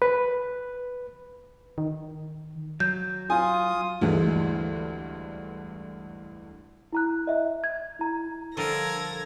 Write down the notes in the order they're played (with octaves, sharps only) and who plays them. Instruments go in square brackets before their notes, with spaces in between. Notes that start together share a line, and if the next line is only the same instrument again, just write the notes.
[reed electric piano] B4
[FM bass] D#3
[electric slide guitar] F#3 [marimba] G6
[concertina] F4 D#6 [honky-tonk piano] G#5
[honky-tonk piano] D2 G2 D3 E3 G#3
[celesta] E4 A#5 F#6
D#5 E5
G#6
E4 A#5
[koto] D3 F3 G3 [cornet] A4 [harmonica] A#4 [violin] G#6 A#6